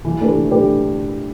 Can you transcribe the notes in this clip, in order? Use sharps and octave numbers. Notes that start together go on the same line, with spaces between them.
E3
A3 D4 G4 B4
E3
A3 D4 G4 B4